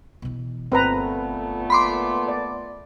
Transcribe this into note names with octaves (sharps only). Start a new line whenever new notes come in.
B2 E3
G1 A#2 A3 B3 C4 B4 A#5
B5 C6 D6
D5